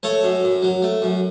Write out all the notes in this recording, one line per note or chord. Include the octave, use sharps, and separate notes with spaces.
A3 A4 C#5
F#2
F#2
F#3
A3
F#2